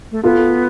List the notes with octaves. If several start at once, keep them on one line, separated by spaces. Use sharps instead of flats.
A3
B3 F4 A4